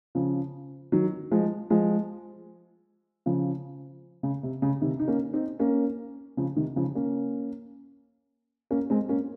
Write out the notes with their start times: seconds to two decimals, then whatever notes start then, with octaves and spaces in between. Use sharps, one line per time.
0.15 C#3 F3
0.92 D#3 F#3
1.31 F3 G#3
1.70 F3 G#3
3.26 C#3 F3
4.23 C#3
4.43 C3
4.62 C#3
4.82 C3 D#3
4.99 D#4
5.08 A#3 C#4
5.34 C4 D#4
5.59 A#3 C#4
6.37 C#3 F3
6.56 C3 D#3
6.76 C#3 F3
6.95 A#3 C#4
8.71 A#3 C#4
8.90 G#3 C4
9.09 A#3 C#4